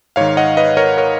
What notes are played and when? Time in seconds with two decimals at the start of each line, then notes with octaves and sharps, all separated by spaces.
0.16 G#2 D#3 C#5 F5
0.37 D#5 F#5
0.57 B4 D#5
0.77 A#4 C#5
0.98 A#4 C#5